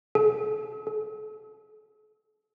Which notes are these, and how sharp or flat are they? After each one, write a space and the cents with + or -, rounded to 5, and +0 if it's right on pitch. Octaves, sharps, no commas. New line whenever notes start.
A4 -45
A4 -40